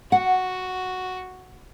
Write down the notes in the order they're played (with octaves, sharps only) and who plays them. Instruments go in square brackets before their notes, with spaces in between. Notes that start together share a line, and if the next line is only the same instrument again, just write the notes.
[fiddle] F#4 [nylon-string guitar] F#5